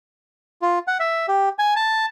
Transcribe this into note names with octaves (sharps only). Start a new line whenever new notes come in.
F4
F#5
E5
G4
G#5
A5